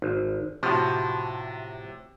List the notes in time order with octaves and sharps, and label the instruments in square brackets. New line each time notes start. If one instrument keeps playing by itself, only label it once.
[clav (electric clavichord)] G#1
[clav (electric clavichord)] A2 F3 [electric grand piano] C3 F#4